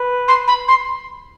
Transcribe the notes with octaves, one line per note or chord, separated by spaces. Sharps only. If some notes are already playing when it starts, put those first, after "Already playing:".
Already playing: B4
C6
B5
C6